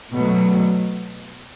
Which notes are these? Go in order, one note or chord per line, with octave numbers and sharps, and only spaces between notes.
B2 F#3 A3